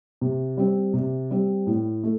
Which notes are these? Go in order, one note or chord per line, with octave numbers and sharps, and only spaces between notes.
C3
G3 C4
C3
G3 C4
A2
A3